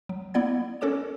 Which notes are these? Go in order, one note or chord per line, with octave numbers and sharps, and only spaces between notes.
F#3
A#3 B3 E4 D5 F#5 G#6
C#4 A4 A#4 C#5 D6 E7